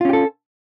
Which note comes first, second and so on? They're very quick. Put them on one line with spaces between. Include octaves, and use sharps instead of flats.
F4 C#4 G4 A4